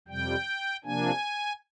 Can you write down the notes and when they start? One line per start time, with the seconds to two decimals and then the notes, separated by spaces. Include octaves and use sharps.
0.08 F2 C3 G3 G5
0.84 C3 F3 A#3 D4 G#5